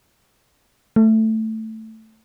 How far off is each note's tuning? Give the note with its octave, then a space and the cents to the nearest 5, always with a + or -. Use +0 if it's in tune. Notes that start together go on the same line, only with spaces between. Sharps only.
A3 +5